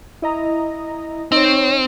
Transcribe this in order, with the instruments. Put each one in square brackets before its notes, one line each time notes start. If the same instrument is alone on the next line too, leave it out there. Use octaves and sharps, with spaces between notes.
[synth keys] E4 D#5 A#5
[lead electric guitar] C4 [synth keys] D#4 C#5